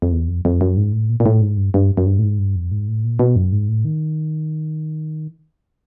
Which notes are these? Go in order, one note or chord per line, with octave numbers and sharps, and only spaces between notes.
F2
E2
F2
F2
F#2
G#2
A2
A#2
A#2
A2
G#2
G2
G2
F#2
G2
A2
G#2
G2
F2
G#2
A2
A#2
B2
F#2
G#2
A2
D#3